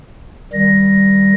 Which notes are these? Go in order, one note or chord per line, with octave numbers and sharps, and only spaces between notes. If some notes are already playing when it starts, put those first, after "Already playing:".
D#3 G3 A#6